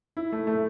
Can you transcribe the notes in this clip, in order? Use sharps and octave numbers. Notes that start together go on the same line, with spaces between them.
E4
A3
A3